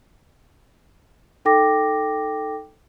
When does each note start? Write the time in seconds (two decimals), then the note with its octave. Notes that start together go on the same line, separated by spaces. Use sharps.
1.45 D#4 A4 G5 D6 A#6